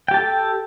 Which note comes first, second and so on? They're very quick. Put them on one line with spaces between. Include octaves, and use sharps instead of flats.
G5 G4 A5 A4